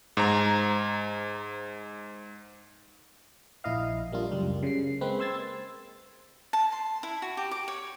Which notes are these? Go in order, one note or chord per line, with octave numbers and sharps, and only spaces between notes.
G#2 C5 A#5
A#1 A#2 E4 D#5 F5
G3 A#3 D4 F4
C#2 F#2 G3
C#3 C7
G#3 A#3 C4 B4
C5 C6 E6 G#6 A6
A5
C6
E4
F#4
G4
D6
C#5